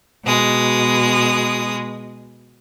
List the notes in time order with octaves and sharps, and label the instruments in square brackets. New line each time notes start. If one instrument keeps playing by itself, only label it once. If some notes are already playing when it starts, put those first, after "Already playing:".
[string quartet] B2 G#3 D#6